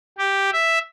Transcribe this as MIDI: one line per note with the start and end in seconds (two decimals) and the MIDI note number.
0.18 0.50 67
0.52 0.78 76